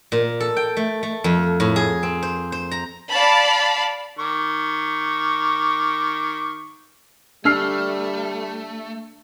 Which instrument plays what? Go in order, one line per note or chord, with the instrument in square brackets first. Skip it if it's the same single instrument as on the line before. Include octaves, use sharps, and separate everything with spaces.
[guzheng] A#2
A4
G5
A3
A3
F2
A2
G#4
C4
C5
C5
A#5
[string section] D5 F5 A5 B5
[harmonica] D#3 C#6 D6
[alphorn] G3 [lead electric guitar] A3 [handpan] D4 [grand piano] E6 F6 C7